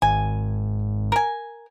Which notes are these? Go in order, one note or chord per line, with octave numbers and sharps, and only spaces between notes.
G#1 G#5
A#4 G#5